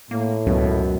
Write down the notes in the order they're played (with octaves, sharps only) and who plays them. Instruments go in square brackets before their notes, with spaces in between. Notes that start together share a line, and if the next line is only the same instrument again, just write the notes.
[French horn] A2 [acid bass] A#3
[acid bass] C#2 [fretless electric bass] F#2 B2